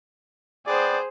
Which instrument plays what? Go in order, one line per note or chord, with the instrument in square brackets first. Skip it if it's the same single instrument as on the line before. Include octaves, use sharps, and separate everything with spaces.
[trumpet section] B3 D5 G5 [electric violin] G#4 C5